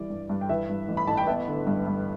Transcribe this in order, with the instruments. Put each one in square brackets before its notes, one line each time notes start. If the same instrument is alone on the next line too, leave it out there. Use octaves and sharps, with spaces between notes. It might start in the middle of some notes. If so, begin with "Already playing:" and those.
Already playing: [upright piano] E3 G3 D5
G2
G2
G5
E3 B4 E5
G2
A1
B5
A1 A5
G5
B3 B4 E5
D3
G2
G2